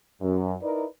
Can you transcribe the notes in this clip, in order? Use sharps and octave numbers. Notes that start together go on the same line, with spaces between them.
F#2
D#4 E4 A#4 B4 D5